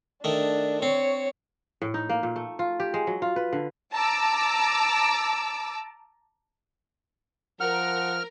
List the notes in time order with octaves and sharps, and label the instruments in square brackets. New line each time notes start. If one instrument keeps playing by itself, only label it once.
[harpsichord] D#3 A3 [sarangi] D4
[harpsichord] C4 [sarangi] C#5
[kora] A2
D#4
A#3
A#2
A3
F4
G4
G#3
F#3
F4
B4
D3
[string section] A5 A#5 D6 E6
[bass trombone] F3 [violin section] A#4 [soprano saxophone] F#5 [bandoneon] F6